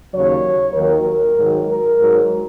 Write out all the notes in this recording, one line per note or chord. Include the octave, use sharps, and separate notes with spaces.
D#2 C#3 F#3 C#5
D#2 D#3 F#3 A#4
G#2 D#3 F#3
A#4
G#2 F#3